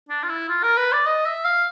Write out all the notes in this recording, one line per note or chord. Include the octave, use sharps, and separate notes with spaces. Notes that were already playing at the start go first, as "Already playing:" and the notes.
D4
F4
E4
F4
A#4
B4
D5
D#5
E5
F5